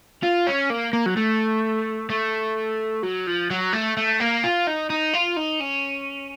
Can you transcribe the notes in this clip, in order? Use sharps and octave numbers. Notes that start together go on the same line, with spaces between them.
F4
C#4
A#3
A#3
F#3
A3
A3
F#3
F3
F#3
A3
A3
A#3
F4
D#4
D#4
F4
D#4
C#4